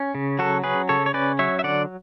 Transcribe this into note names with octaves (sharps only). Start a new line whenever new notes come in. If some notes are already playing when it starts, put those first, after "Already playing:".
Already playing: C#4
C#3
F#3 F#4 A4
C#4 G#4 B4
C#3 A4 C#5
C#5
C#4 B4 D5
F#3 C#5 E5
E5
D3 D5 F#5